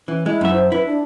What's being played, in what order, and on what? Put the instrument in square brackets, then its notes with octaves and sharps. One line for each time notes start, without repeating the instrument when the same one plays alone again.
[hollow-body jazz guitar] E3 [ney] C#4
[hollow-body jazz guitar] G#3 [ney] E4
[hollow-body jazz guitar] F#2 E5
[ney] C5
[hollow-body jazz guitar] E4 [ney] B4
[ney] D4